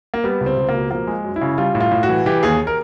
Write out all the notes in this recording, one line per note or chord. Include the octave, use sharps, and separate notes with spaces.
A#3
G3 B3
C#2
C4
C#2
A#3
B2
F3 A#3
G#3
F#2
E4
C#3
G3 F4
A2
F4
A2
F#4
E3
E3 G4
D#2 G#4
A#4